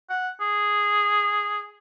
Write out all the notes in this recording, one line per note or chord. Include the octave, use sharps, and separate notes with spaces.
F#5
G#4